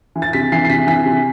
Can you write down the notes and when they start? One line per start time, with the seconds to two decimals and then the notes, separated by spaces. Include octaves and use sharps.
0.16 E3
0.22 A6
0.33 C3 B6
0.52 E3 C7
0.65 C7
0.69 C3 B6
0.87 E3 B6
1.06 C3